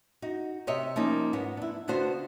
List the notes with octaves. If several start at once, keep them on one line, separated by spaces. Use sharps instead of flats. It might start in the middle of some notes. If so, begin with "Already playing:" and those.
D#4 F#4
C3 G4 C#5 D#5 E5
F3 A#3 C#4 D#4
G#2 B3 C#5
D4 E4
D3 B3 D4 F4 F#4 C5